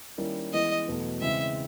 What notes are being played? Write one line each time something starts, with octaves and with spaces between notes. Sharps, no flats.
D#3 G3 A#3 C#4 E4
E3 G#3 B3 E4 D#5
E2 B2 F#3 A3
C#3 E3 G#3 C4 E5